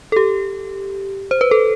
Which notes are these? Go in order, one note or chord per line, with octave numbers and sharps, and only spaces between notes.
A4
G4
C5
B4
A4